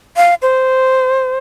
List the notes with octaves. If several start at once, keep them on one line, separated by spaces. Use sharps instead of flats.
F5
C5